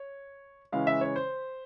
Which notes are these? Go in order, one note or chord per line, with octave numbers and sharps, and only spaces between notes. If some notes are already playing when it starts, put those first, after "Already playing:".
Already playing: C#5
C#3 E3 G#3 C#4 F5
E5
C#5
C5